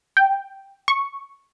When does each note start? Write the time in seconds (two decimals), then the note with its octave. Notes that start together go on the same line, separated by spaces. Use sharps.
0.17 G5
0.88 C#6